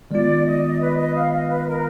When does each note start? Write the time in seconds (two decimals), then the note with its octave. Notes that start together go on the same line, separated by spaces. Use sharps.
0.10 D#3 G#3 B3 F4 D5
0.45 D#5
0.80 B4
0.97 D#5
1.14 F5
1.32 D#5
1.49 B4
1.67 A#4